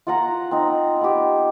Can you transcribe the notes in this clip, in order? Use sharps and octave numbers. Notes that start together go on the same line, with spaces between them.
F4 F#5 A#5
C4 D#4
B3 G4